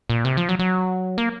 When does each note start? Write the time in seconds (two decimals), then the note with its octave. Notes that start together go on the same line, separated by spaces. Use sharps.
0.10 A#2
0.25 C3
0.37 F3
0.49 F#3
0.59 F#3
1.18 A#3